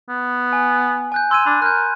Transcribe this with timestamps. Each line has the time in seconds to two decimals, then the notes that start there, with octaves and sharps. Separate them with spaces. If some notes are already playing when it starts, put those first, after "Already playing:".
0.09 B3
0.53 G#5
1.12 G#5 F#6 G6
1.31 C6 E6 G#6 D#7
1.46 D4 B5
1.62 A#4 F#6 G6